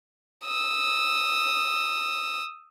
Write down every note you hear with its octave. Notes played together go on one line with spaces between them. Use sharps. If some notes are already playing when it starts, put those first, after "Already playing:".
D#6 E6